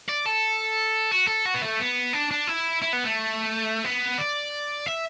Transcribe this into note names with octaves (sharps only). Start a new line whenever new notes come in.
D5
A4
F#4
A4
F#4
B3
A3
B3
D4
D4
E4
E4
B3
A3
B3
D5
E5